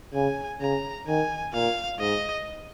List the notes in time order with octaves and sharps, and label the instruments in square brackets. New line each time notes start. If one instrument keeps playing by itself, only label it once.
[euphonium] C#3 [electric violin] G#5
[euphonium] C#3 [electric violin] A#5
[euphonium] D#3 [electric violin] G#5
[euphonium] A#2 [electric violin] F5
[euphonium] G#2 [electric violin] D#5